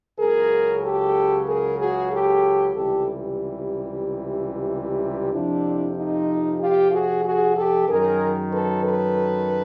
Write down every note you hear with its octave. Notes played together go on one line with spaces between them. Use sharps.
C#2 C#3 F#3 G#4 A#4
G4 A4
G#4 A#4
F#4 G#4
G4 A4
C#2 C3 E3 G3 G4 A4
F2 C3 F3 D4 E4
D#4 F4
F4 G4
F#4 G#4
F#4 G#4
G4 A4
F#2 D#3 F#3 G#4 A#4
A4 B4
A4 B4